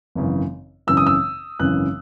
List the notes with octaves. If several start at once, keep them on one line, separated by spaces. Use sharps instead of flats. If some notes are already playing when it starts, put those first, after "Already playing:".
G#1 F#2 C#3 E3
G#1 F#2 C#3 E3 E6
D#6
E6
G#1 F#2 C#3 E3 F#6